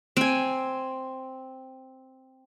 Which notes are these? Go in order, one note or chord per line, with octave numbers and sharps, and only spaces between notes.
C4 G#5